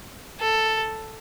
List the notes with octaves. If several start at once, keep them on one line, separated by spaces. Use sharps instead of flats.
A4